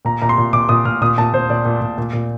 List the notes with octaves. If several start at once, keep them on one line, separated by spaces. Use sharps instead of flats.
A#2 A#5
A#2 A#5
C6
A#2
A#2 D6
A#2 D#6
A#2 F6
A#2 D#6
A#2 A5
A#2 C5
A#2 D5
A#2
A#2
A#2
A#2